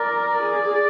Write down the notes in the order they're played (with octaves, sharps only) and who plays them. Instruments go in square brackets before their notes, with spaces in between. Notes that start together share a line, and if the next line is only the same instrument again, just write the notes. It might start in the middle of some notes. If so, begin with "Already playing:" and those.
Already playing: [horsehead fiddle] A#4 [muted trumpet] D5
[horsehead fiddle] G#4